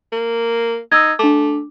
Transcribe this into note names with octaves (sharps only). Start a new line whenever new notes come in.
A#3
D#4 E6 G#6
A3 D4 D6